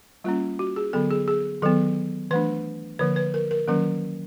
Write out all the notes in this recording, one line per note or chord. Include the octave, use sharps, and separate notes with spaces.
G3 A#3 C#4 F4
F#4
G#4
D3 F#3 B3 A4
G#4
G#4
D#3 F#3 B3 A4
E3 A3 D4 B4
D3 F3 A#3 B4
B4
A#4
A#4
D#3 F#3 A#3 C#4 A#4